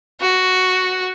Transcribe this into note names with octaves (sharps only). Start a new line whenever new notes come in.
F#4